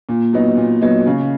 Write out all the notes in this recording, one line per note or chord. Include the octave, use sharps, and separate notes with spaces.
A#2
F#3 B3 D#4
A#2
F#3 B3 D#4
C#3